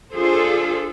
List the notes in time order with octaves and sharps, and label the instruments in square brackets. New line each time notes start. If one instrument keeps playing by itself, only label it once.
[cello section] D4 F4 G#4 A4 C5